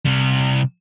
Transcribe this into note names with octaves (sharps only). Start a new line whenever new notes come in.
C3 G3